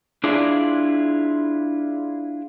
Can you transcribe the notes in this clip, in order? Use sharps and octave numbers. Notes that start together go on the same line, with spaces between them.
D4 E4 F4 G#4 D5